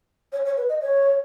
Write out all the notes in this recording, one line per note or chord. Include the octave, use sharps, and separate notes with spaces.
C#5
C#5
B4
D#5
C#5